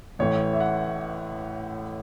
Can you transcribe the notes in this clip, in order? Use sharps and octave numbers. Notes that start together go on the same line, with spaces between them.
A1 A2 E3 C#5
E5
F#5